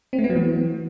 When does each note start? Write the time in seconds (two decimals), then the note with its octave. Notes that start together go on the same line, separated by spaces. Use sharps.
0.13 C4
0.18 A3
0.24 B3
0.30 F#3
0.35 E3